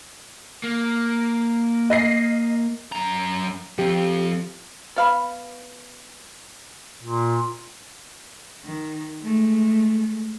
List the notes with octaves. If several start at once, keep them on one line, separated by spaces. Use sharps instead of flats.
A#3
D#5 A#6 C7
F#2 A#5
F3 C4 G4
B3 F5 B5
A#2
D#3
G#3 A3